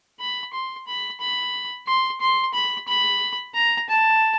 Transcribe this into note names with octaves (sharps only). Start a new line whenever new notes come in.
B5
C6
B5
B5
C6
C6
B5
B5
A#5
A5